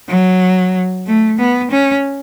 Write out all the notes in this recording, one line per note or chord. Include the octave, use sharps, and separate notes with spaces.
F#3
A3
B3
C#4